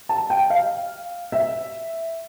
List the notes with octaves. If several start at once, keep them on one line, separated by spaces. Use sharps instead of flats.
A5
G5
F5
E5